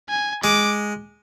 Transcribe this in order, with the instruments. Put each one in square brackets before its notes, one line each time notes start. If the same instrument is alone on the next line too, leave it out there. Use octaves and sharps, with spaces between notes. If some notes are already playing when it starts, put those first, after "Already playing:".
[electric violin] G#5
[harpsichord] G#3 [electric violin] D6